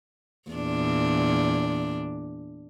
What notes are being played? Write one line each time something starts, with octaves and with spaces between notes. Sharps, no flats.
E2 A#2 D4